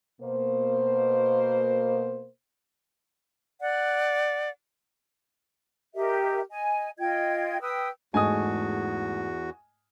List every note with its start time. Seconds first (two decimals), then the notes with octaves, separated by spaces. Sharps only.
0.21 B2 A#3 C5
3.60 D5 F#5
5.95 G4 A#4 D#5 E5
6.50 D#5 G#5
6.99 F4 D#5 G5 G#6
7.61 B4 G5 D#6 E6
8.14 E2 G#2 A3 F#4 D#5 G#5 D#6